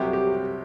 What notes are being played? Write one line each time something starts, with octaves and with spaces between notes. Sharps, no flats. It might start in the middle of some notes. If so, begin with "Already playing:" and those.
Already playing: C2 C3 F#3 G4
G4